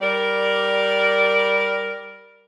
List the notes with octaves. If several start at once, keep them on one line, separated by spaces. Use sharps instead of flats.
G3 A#4 D5